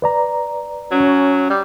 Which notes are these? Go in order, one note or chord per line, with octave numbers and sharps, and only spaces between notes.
B4 D5 A#5
F#3 C#4
G3